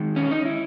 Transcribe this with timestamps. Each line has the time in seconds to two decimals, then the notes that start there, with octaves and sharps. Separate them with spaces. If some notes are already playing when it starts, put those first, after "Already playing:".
Already playing: D#3 G#3
0.16 C#4
0.31 D#4
0.45 E4